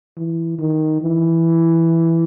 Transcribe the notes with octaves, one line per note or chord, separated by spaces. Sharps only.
E3
D#3
E3